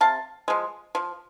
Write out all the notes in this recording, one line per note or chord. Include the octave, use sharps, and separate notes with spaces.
C3 F5 A5
F3 G#3
F3